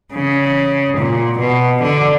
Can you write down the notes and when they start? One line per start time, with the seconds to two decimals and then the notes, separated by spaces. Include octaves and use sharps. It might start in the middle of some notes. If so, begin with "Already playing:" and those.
0.13 C#3
0.98 A#2
1.39 B2
1.83 D3